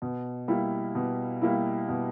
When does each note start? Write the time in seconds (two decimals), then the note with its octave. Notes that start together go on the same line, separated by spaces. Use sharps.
0.02 B2
0.48 G3 A#3 E4
0.95 B2
1.42 G3 A#3 E4
1.89 B2